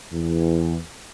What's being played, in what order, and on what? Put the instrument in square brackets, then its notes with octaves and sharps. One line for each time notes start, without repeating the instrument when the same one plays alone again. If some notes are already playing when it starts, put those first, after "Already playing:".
[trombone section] E2